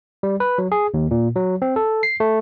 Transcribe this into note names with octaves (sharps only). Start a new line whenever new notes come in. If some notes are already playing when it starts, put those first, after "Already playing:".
G3
B4
F#3
G#4
D#2
A#2
F#3
C4
A4
C7
A3